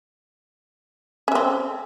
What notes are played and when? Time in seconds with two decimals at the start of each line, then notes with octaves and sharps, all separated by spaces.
1.28 C#4
1.32 E5
1.35 C4